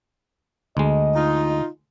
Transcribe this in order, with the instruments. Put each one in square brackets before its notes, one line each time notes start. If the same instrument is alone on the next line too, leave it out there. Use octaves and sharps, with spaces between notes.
[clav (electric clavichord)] D2 G#3 [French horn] D#5
[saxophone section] D#4 F4